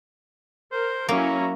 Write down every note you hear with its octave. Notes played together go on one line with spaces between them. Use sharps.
A#4 C5
F#3 A#3 C#4 E4 A#5